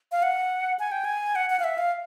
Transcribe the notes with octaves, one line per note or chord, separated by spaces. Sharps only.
F5
F#5
G#5
G5
G#5
F#5
F#5
F5
E5
F5